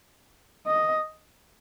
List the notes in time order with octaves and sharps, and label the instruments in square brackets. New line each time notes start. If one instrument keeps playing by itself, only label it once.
[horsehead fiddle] D#5